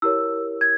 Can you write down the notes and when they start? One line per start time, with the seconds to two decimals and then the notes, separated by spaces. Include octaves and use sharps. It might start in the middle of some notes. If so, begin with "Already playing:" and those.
0.02 E4 G4 A#4 C#5 E6
0.61 G#6